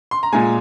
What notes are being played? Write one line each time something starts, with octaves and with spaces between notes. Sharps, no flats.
C6
A#5
A#2 G#3 G#5